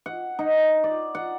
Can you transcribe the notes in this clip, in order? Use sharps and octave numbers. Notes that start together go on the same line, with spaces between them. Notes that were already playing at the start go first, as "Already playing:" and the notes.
F#5
D#4
D5
F#5